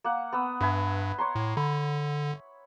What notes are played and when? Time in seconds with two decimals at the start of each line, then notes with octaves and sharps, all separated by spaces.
0.04 A#3 F#5
0.32 B3 D#6 E6
0.61 G2 B4 E5 G#5
1.18 C#5 A#5 C6
1.35 A2
1.57 D3 B5